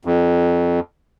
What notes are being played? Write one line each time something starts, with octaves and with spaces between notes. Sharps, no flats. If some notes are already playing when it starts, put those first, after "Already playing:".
F2